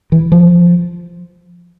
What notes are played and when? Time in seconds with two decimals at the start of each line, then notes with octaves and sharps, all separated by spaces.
0.12 E3
0.32 F3